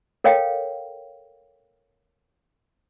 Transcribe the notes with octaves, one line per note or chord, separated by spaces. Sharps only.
A4 A#4 C#5 F5 G5